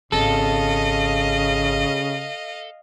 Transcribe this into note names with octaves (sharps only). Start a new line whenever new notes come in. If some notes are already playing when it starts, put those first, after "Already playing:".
G#1 C#3 A4 D#5 F5